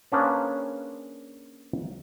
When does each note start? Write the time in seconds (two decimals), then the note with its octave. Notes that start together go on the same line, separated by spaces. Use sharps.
0.12 A#3 C#4 D4 G#4 B4 C5